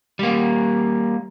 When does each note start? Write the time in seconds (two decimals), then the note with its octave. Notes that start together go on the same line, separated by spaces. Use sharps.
0.19 G3 A#3